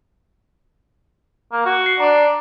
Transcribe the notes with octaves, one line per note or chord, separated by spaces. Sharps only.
A#3
F#4
C7
D4 A#5 D6